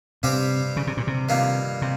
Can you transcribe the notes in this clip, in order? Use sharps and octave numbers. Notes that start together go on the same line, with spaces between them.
G2 C3 G3 C4 G4 C5
C#3
C3
A#2
C3
G2 D#3 A#3 F4
C3